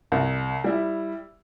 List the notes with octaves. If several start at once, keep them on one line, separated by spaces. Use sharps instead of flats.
C2
G3 E4